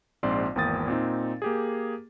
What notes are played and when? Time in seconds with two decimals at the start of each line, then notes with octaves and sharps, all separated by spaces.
0.23 A#1 G#2 C4 C5 D5 C6
0.56 G#1 E2 A#3 G5 D#6 A6
0.88 A#2 C4 D#4
1.42 A#3 G4 G#4